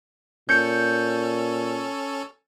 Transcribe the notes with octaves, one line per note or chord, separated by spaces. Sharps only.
A#2 C#4 A4 G6 C#7